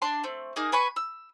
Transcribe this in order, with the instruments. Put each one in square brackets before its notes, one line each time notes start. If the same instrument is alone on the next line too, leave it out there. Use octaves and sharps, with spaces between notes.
[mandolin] D4 A5 C6
A3 C4
A#3 D#4 G#4 D#5
B4 G#5 B5 C#6
E6